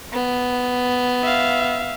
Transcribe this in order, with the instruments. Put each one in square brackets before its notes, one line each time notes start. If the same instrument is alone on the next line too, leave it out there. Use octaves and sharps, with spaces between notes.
[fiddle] B3
[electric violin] E5 F5